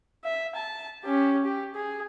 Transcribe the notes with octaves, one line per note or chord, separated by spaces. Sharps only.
E5
A5
C#4 G4
G4
G#4